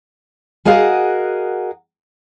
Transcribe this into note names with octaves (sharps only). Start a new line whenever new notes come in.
F#4 G#4 A#4 D#5 F5 F#5